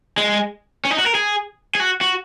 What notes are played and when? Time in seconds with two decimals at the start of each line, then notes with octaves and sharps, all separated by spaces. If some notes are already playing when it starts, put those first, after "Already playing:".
0.18 G#3
0.85 C#4
0.91 D#4
0.99 F#4
1.06 A#4
1.15 G#4
1.75 G#4
1.80 F#4
2.01 F#4